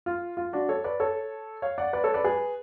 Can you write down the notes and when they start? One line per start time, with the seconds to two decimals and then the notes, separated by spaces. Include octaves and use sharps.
0.06 F4
0.37 F4
0.53 D4 F#4
0.69 A4 C#5
0.84 B4 D5
1.00 A4 C#5
1.62 C#5 F5
1.78 D5 F#5
1.93 B4 D5
2.04 A4 C#5
2.14 B4 D5
2.24 G#4 B4